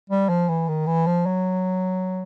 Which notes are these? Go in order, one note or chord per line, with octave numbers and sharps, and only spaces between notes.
G3
F3
E3
D#3
E3
F3
F#3